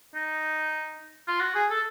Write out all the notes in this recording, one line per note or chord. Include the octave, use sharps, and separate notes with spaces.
D#4
F4
F#4
G#4
A4